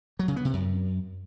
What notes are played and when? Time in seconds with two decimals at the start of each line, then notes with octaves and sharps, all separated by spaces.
0.19 F#3
0.28 C#3
0.36 B3
0.45 C3
0.53 F#2